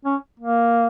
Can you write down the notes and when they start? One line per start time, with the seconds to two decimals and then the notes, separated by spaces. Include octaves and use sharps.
0.05 C#4
0.40 A#3